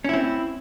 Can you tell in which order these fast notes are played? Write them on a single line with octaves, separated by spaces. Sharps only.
C#4 E4 C4